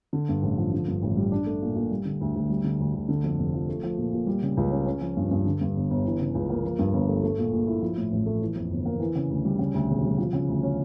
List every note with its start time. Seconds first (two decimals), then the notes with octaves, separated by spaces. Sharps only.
0.13 D3
0.29 G2
0.43 A1
0.58 F3
0.72 D3
0.88 G2
1.03 A1
1.17 G3
1.32 D4
1.46 A3
1.62 A#2
1.76 A#2
1.91 G3
2.05 D3
2.21 D2
2.35 D2
2.50 G3
2.64 D3
2.80 D2
2.94 D2
3.09 D3
3.24 F2
3.39 F1
3.54 F3
3.69 A3
3.83 F3
3.98 A#2
4.13 A#2
4.27 G3
4.43 C#3
4.57 C#2
4.71 C#4
4.86 C#4
5.01 F3
5.17 G2
5.31 G2
5.45 D3
5.61 G2
5.76 G1
5.90 G1
6.05 E3
6.20 C#3
6.35 C#2
6.50 A#3
6.64 F3
6.79 G2
6.93 G1
7.08 A3
7.23 A3
7.38 A#2
7.53 A#1
7.67 E4
7.82 F3
7.97 A2
8.12 A1
8.26 A3
8.42 E3
8.56 F2
8.70 G1
8.85 A#3
9.00 E3
9.15 C#3
9.30 D2
9.45 G3
9.59 C#3
9.74 D2
9.89 E1
10.04 G3
10.18 F3
10.33 C#3
10.48 D2
10.63 C#4